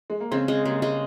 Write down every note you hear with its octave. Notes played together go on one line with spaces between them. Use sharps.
G#3
A#3
C#3 G#3 C4
G#3
C#3 G3 A#3
G#3